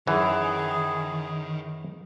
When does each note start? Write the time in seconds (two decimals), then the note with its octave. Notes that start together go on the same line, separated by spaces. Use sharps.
0.07 F#2 D#3 E3 G#4